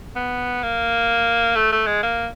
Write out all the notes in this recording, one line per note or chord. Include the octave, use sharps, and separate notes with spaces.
B3
A#3
A3
A3
G#3
A#3